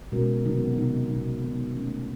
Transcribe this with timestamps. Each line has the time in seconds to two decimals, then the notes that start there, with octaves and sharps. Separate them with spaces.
0.12 B2 G#3 C#4 F#4 A#4
0.45 C3 D#3 F#3 B3 D#4
0.77 C3 D#3 F#3 B3 D#4
1.10 C3 D#3 F#3 B3 D#4
1.42 C3 D#3 F#3 B3 D#4
1.75 D#3 F#3 A3 C#4